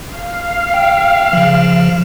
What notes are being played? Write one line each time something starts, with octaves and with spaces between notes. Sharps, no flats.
F5
G5
C#3 F3